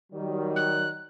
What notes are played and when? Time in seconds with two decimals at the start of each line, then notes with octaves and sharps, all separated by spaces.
0.13 D#3 F#3 G3
0.56 F#6